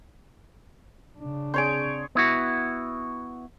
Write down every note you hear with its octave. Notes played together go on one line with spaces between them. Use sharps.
C#3 D4
C4 G#4 C#5 D5 C6 G6 D7
B3 E4 F#4